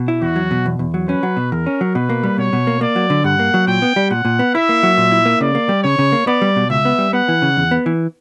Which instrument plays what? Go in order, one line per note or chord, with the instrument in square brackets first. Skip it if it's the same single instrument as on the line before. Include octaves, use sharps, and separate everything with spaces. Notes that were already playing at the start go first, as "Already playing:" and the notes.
Already playing: [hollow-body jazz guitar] B2
E4
[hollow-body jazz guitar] E2 [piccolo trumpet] F#4
[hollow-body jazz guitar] F#3
B2
E2
E2
F#3
[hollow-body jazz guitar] C#4 [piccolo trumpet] B4
[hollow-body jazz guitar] F#3
B2
[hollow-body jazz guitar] E2 [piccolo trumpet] A#4
[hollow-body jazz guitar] C#4
F#3
[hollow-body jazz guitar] B2 [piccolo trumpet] B4
[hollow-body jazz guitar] A#3
G3
[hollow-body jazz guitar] B2 [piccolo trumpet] C#5
[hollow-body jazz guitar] B2
A#3
[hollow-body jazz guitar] A#3 [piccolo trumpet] D5
[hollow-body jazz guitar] F#3
D3
[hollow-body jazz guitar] G2 [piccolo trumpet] F#5
[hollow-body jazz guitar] A#3
F#3
[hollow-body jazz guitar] A#2 [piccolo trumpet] G5
[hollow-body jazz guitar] B3
G3
[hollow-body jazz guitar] A#2 [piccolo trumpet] F#5
[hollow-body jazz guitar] A#2
B3
[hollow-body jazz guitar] E4 [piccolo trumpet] E5
[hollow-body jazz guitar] A#3
F#3
A#2
E4
A#3
[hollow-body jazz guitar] C#3 [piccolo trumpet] D5
[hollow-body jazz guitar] A#3
G3
[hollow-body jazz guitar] C#3 [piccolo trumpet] C#5
[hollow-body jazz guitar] C#3
A#3
[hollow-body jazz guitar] B3 [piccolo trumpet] D5
[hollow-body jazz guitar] G3
B2
[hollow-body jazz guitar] C#2 [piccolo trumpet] E5
[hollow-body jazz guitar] B3
G3
[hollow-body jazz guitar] B3 [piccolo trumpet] F#5
[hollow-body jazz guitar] E3
C#3
E2
B3
E3